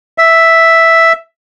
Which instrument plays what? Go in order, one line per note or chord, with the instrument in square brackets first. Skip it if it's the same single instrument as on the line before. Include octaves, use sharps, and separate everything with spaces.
[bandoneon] E5